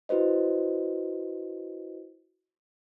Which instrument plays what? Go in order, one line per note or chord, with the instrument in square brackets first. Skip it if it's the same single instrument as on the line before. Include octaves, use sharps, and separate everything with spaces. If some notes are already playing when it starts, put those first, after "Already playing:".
[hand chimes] E4 F#4 B4 C5 D#5